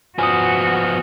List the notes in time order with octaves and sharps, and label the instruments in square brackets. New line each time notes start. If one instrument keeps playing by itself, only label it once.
[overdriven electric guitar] F3 B3 [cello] F#4 [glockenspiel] G#5 D#6